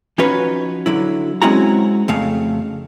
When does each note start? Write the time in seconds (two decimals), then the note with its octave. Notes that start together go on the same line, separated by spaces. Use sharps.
0.18 F3 C#4 D#4 F#4 B4 C#5
0.86 D3 F#3 E4
1.42 G#3 C4 C#4 E4 F#4 A#5
2.08 F2 C#3 A3 F5